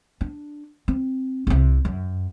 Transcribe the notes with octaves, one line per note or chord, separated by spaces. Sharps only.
D4
C4
C2 C3
F#2